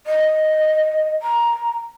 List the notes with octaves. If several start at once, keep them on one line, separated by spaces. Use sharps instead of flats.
D#5
A#5